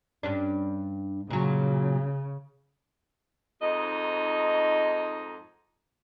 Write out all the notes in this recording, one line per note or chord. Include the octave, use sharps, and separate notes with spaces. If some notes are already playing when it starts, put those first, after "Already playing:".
G2 C#4 D4
A#2 C#3 F#3
F2 G#2 D#4 D#5